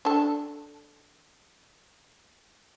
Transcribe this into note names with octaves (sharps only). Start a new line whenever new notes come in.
D4 A4